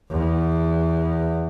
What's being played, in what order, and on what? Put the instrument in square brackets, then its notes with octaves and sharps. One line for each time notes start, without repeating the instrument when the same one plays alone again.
[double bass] E2